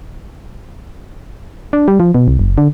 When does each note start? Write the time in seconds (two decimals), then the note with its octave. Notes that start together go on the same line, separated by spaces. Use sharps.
1.73 D4
1.88 G3
2.00 F3
2.14 B2
2.28 C2
2.39 F#1
2.58 D3